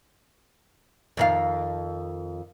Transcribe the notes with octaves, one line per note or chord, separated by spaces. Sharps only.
F2 D#3 F5